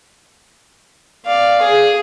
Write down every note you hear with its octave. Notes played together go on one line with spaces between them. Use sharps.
D5 F5
G#4